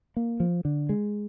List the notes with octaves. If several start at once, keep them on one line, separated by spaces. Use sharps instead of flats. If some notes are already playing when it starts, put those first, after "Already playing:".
A#3
F3
D3
G#3